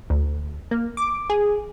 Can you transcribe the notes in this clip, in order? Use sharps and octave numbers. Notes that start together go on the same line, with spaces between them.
D2
A#3
D6
G#4